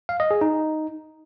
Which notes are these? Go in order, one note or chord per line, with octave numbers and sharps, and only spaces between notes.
F5
D#5
G#4
D#4